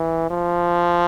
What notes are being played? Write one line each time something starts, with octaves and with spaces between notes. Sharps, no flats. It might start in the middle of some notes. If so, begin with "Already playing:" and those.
Already playing: E3
F3